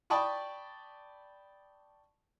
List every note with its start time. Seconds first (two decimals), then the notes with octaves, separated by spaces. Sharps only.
0.10 D5 G5 A5 B5 C#6 D#6